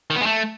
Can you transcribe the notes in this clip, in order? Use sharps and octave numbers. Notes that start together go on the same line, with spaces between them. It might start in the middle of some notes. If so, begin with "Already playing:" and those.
D#3
B3
G#3
A3